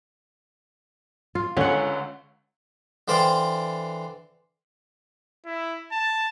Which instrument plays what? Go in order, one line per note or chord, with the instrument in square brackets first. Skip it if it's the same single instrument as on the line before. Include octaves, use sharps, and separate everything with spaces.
[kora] F4
[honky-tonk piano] C#2 D3 [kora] C#4 F#5
[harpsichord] D3 E3 C5 D5 F5 G5
[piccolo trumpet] E4
A5